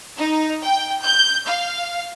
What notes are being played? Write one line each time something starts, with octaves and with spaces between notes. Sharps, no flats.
D#4
G5
G6
F5